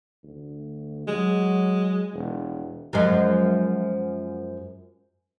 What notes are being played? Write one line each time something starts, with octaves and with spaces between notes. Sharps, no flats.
D2
F#3 G#3
E1
F#2 F3 G#3